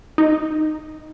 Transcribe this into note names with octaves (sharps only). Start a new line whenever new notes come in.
D#4